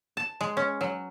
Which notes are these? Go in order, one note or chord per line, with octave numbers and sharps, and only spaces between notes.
A5
G#3
C#4
F#3